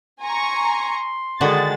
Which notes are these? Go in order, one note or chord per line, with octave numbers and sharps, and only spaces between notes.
G#5 A#5 C6 C#6
D3 D#3 G#3 F#4 A6